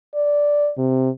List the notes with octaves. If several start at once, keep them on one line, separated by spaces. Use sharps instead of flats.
D5
C3